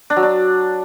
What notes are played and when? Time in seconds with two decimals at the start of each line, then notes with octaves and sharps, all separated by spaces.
0.10 D4
0.16 F#3
0.23 D4